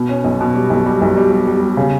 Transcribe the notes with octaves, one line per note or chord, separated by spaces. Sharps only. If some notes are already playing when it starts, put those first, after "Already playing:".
Already playing: B2
C#4
B1
B2
G3
B1
G3
B1
G3
G3
G3
G3
C#3